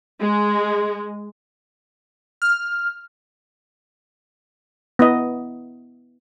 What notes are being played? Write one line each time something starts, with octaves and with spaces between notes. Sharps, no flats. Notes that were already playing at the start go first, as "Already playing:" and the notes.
G#3
F6
B3 E4 D#5